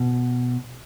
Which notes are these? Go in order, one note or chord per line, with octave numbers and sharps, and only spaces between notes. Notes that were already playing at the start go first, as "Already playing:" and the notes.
Already playing: B2